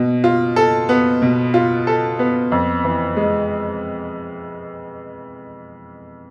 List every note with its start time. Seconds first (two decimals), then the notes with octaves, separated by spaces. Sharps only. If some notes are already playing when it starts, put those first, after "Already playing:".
Already playing: B2
0.24 F4
0.56 A4
0.89 B3
1.22 B2
1.54 F4
1.87 A4
2.19 B3
2.52 F2
2.84 E3
3.17 G#3